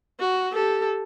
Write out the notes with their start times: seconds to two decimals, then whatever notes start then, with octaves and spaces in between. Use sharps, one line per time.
0.20 F#4
0.52 G4 A4